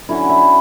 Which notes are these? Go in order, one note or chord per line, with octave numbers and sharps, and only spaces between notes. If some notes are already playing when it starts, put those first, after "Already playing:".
D3 F#3 C#4 E4
E4